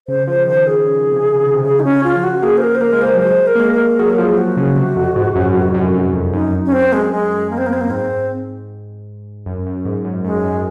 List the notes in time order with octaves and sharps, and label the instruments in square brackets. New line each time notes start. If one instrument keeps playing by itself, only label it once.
[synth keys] C#3 [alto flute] C5
[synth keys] F3 [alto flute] C5
[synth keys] D#3 [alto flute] C5
[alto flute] G#4
[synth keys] C#3
C3
C#3
C3
[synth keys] C#3 [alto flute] G#4
[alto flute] D#4
C#4
F4
[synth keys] F3
[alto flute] F#4
[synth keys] A#3 [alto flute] G#4
[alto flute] C5
A#4
C5
[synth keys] A#3 [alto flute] A#4
[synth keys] G#3
[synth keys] A#3 [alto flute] C5
[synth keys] F#3
[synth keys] G#3 [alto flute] C5
[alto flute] A#4
[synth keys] A#3
G#3
[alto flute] A#4
[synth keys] F#3 [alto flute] G#4
[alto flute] A#4
[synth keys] F3 [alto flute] G#4
[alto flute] F#4
[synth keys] C#3
C3
F2
G#2
F#2
F2
F#2
F#2
F2
[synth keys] F#2 [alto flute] D#4
[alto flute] C#4
C4
G#3
G#3
A#3
C4
A#3
C4
A#3
[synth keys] G#2 [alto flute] C4
[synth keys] F#2
F#2
G#2
F#2
[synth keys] F#2 [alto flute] G#3
[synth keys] F#2